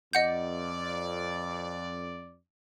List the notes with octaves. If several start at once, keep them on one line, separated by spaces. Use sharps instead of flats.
F2 D5 D#5 F#5 G6